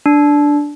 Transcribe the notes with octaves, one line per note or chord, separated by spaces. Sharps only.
D4